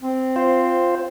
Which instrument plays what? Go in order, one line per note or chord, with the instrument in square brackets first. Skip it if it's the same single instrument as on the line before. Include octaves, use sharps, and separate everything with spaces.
[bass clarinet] C4
[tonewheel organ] F4 C5